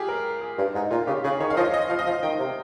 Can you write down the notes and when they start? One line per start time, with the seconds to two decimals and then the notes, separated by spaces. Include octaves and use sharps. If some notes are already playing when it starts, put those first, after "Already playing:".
Already playing: F4 G4 G#4
0.08 A#4
0.41 G#4
0.58 G2
0.74 G#2 D#4
0.91 A#2 F4
1.07 C#3 G4
1.24 C#3 G#4
1.40 D#3 C#5
1.50 F5
1.53 D#3
1.57 F3 D#5
1.74 D#5
1.90 F3 F5
1.99 D#5
2.06 F3 F5
2.23 D#3 G5
2.39 C3